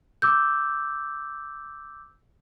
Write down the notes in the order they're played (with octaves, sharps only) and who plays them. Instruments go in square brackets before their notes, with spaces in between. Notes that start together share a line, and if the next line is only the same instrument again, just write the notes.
[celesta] D6 E6 G6